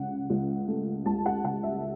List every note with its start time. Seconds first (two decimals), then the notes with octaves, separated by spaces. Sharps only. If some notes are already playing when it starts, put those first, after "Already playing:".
Already playing: C#2 C#3 F#5
0.30 C#2
0.68 A3
1.06 C#2 A5
1.26 F#5
1.44 C#3 F#5
1.63 E5